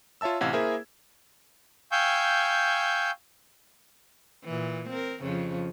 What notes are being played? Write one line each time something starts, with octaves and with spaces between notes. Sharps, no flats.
F4 C#5 E5 A5 E6
A1 C3 E4 F5 F#5 G#6
A#3 E4 G#4 A#4 C5 E5
F5 G5 G#5 C#6 E6 G6
A#2 E3
C4 A#4
F2 C#3 F3